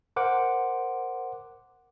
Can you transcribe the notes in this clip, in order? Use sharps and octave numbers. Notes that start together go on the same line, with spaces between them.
A#4 C5 F#5 D6